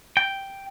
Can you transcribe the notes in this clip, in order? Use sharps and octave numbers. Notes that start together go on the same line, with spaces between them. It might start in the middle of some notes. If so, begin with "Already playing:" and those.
G5